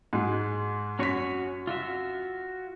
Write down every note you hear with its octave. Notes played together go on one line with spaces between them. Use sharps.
G#2 F#3 G#3
F#2 C#4 F#4 C#5 B6
F4 F#4 E5